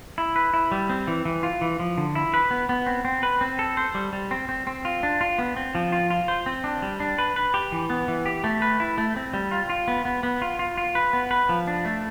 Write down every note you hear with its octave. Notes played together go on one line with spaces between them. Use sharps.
E4
B4
E4
G3
C4
E3
E3
F4
E3
F3
D3
E4
B4
B3
B3
C4
C4
B4
C4
A4
C5
G3
G3
C4
C4
C4
F4
D4
F4
B3
C4
F3
F4
F4
C5
C4
D4
G3
D4
B4
B4
G4
E3
B3
E3
G4
A3
B4
E4
A3
C4
G3
F4
F4
B3
B3
B3
F4
F4
F4
B4
B3
B4
F3
D4
A3